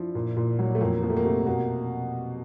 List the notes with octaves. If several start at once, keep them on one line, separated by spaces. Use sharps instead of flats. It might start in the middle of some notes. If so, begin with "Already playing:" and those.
Already playing: F3 D4 E4
A#2
A#2
F#3
A3
F2 A#3
F3 A#3
A3
A#3
C3 A3
B2 A#3